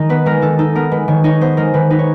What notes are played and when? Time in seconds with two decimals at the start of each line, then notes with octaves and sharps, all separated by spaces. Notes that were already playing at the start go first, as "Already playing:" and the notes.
Already playing: D#3 G#3 D#4
0.09 B3 B4
0.26 G#3 A#4
0.42 D#3 A4
0.59 D#4 A4
0.75 B3 A#4
0.91 G#3 B4
1.08 D#3 C#5
1.24 D#4 C#5
1.41 B3 C5
1.57 G#3 A#4
1.74 D#3 B4
1.90 D#4 B4
1.99 C#5